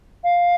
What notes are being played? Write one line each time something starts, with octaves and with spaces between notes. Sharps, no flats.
F5